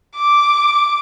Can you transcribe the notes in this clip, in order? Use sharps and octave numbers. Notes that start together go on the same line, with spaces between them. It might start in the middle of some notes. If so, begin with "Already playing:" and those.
D6